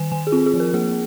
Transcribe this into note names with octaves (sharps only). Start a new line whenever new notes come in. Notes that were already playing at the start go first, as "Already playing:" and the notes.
Already playing: D#3 G#5
D#3 G#5
G#4
C4 F4
G#4
F3
A#4
A#3 G#4